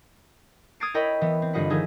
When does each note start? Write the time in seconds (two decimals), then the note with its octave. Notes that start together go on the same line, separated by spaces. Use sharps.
0.80 D#6 F6 G#6 A6 C7 D7
0.94 E4 A#4 C#5 D#5 G5 B5
1.21 E3 B3
1.42 C4
1.53 G1 G3 F4 D#5 F#5 B5
1.70 D#3 F3 D#4 E4 G#4